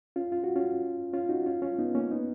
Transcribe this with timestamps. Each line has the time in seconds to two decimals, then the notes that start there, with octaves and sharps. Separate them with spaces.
0.16 C#4 F4
0.32 F4
0.44 F#4
0.56 C#4 F4
1.13 C#4 F4
1.29 D#4 F#4
1.46 C#4 F4
1.62 C#4 F4
1.79 B3 D#4
1.95 A#3 C#4
2.11 B3 D#4